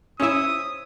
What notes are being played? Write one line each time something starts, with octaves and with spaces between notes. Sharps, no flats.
C#4 E4 C5 C#5 E5 D#6